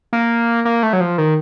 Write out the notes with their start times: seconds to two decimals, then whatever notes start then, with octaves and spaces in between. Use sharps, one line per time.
0.13 A#3
0.65 A#3
0.83 A3
0.93 F#3
1.00 F3
1.18 D#3